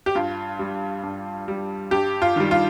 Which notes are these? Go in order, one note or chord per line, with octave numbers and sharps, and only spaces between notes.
G4
G2 F4
G3
G2
G3
G2 G4
F4
D#3 G3
F4